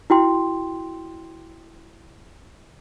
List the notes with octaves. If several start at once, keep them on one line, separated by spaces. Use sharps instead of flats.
E4 F#4 G5 C6